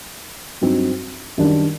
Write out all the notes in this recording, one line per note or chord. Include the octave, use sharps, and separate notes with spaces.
G2 F#3 C4 D#4
F#2 D#3 G3 D4